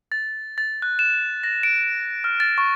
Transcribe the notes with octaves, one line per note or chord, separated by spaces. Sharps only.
A6
A6
F#6
E7
A#6
D7
F6
A6
C#6